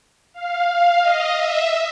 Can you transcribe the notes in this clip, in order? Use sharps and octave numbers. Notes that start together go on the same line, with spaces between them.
F5
F5
D#5
E5